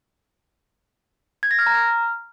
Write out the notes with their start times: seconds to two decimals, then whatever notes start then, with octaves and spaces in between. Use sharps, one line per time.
1.43 G#6
1.51 A#6
1.59 F6
1.67 A#5
1.74 F6